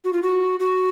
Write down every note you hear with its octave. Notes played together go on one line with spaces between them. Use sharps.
F#4
F4
F#4
F#4